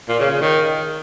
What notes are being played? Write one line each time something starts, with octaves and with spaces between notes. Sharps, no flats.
A#2
C#3
C#3
D#3